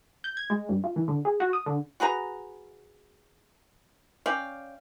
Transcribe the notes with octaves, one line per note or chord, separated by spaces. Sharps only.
G6
G#6
G#3
G2
F4
E3
D3
G#4
F#4
D#6
D3
F#4 G#4 B4 A#5
C#4 D5 F5 G5